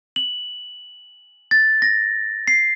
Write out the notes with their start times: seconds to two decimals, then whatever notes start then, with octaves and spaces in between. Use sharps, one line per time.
0.16 F#7
1.51 A6
1.82 A#6
2.48 C7